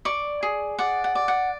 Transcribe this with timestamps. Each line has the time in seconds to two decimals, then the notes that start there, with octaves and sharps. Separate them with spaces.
0.05 D5 C#6
0.43 G#4
0.79 D5 F#5
1.04 F#5
1.15 D5
1.28 F#5